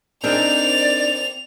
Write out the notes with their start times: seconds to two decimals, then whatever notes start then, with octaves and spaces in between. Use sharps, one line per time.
0.24 C4 D4 D#4 G#4 A#4 D5 F7